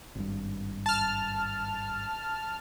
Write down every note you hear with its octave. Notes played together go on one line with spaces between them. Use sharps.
G#1 G2
A5 F6